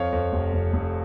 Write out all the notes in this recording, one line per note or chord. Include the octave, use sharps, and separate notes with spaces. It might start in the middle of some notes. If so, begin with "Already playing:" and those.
Already playing: F2 C#5 F5
F2
F1
F1
F1